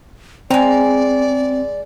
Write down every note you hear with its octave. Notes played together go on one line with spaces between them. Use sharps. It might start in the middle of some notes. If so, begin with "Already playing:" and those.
G#3 C4 D5 A#5